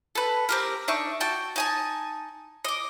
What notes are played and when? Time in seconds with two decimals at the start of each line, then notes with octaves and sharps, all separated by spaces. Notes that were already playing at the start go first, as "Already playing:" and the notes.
0.15 A4 B4
0.49 C4 G4 A#4
0.88 D4 D#4 E5 C#6
1.20 F#4 G5 A5
1.56 D#4 G#5 A5
2.65 D#5 D6